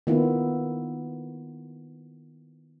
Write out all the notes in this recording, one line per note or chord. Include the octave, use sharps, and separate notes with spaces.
D#3 A#3 B3 E4 F4